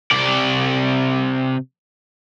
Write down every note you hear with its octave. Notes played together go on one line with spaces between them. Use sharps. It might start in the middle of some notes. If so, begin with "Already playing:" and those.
C3 D5